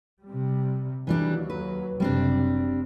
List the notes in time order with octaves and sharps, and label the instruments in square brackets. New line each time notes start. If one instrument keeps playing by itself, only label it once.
[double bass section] C3 G3
[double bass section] D#2 F#3 [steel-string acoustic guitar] E3 G3 D4
[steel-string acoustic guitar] B4
[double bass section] F#1 C3 [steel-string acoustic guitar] G3 C4 D4